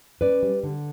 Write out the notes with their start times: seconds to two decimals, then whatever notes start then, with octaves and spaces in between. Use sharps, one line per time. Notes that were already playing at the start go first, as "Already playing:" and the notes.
0.21 C#4 B4 D5
0.43 G3
0.63 D3